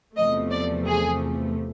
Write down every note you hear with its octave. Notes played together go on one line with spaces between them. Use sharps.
E2 C3 F3 A3 D#5
D5
G#4